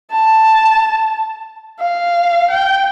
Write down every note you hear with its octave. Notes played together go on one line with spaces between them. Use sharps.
A5
F5
G5